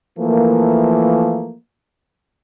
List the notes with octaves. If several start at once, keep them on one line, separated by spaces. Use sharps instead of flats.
E3 F3 A3 A#3